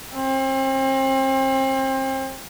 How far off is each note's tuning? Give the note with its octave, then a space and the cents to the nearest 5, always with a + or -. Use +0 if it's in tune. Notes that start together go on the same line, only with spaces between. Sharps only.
C4 +35